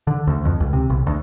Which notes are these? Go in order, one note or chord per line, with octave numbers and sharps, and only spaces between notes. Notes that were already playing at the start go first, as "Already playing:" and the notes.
D3
D2
F2
C#2
C3
B1
D2